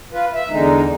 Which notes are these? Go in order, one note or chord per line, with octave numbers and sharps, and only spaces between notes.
F4 B4
E5
E2 D3 G#3 D#4